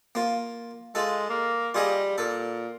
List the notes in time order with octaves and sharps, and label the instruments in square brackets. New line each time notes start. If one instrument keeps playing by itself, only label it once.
[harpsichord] A#3 F4
[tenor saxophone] G#3 [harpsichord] F4 A4
[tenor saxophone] A#3
[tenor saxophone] G3 [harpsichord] F4 G#4 D#5
[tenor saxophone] A#2 [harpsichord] A4